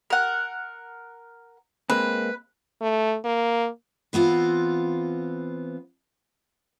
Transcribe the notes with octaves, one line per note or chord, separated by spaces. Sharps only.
A#4 F#5
G#3 A#3 C4 B4
A3
A#3
E3 B3 C4 F4